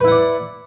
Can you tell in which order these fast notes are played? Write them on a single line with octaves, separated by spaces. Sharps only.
B4 E4 F#5 D5